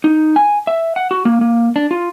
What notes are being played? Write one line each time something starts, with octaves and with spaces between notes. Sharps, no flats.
D#4
G#5
E5
F#5
F#4
A#3
A#3
D4
F4